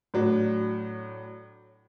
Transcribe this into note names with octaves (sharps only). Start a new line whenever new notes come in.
A2 F#3 D4